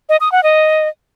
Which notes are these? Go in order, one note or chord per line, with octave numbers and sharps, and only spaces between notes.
D#5
D#6
F#5
D#5